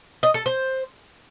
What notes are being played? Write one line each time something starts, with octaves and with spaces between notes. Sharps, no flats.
D#5
A4
C5